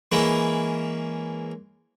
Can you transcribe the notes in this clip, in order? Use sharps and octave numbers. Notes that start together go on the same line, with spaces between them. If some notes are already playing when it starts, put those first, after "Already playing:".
E3 G#3 A#3 C#4 E4